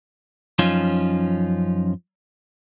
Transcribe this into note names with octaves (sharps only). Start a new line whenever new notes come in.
F#2 F3 C#4 D#4 F4